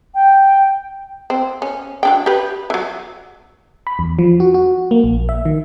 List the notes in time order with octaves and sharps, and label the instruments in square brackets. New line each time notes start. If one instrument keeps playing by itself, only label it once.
[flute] G5
[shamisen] C4
C#4
F#3 D4 G5
G4 B4
E3 F#3
[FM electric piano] B5
E2
F3
F#4
F#4
A#3
A#1
E5
D#3